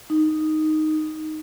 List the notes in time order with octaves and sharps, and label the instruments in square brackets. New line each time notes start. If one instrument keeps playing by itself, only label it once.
[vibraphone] D#4